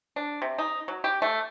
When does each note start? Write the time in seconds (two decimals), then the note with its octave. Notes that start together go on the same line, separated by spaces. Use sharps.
0.16 D4
0.42 C3
0.58 D#4
0.88 F#3
1.04 G4
1.22 A3